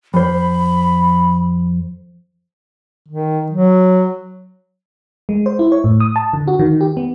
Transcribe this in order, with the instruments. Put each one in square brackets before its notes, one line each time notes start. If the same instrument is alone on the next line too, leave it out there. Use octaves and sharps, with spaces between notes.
[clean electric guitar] F2 C5 [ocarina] B5
[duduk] D#3
F#3
[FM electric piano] G#3
C5
E4
C#5
A2
D#6
A5
D3
F#4
D#3
G4
B3